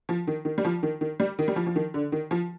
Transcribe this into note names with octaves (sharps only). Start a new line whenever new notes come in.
F3
D#3
D#3
G3
F3
D#3
D#3
G3
D#3
G3
F3
F3
D#3
D3
D#3
F3